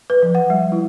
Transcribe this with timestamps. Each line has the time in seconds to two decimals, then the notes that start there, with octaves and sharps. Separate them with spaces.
0.10 B4
0.23 F3
0.35 F#5
0.50 G3
0.72 E4